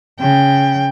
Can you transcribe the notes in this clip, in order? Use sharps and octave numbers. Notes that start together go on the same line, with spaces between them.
C#3 G5